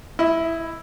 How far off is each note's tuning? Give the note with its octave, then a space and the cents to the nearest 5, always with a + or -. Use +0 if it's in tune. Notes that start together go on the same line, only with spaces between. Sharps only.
E4 +0 D#5 +35